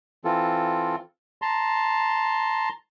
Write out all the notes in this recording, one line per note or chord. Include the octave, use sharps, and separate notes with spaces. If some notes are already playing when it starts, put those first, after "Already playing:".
E3 C4 F4 A4
A5 A#5 C6